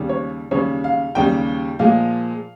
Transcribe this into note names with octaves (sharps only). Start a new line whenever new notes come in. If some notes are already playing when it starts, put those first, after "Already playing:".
Already playing: D#2 C#3 G3
C#5
D#2 C#3 G3 C#5
F5
D#2 C#3 G3 G5
A#2 F3 G#3 F5